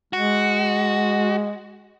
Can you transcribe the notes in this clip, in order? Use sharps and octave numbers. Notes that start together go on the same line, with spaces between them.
G#3 F#4